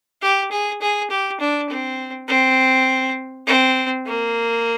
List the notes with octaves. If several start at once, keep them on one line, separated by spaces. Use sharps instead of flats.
G4
G#4
G#4
G4
D4
C4
C4
C4
A#3